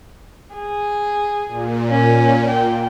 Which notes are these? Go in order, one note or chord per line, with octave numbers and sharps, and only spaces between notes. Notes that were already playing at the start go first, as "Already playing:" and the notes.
G#4
A#2
C#4
G5